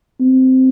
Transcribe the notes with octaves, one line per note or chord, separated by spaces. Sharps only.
C4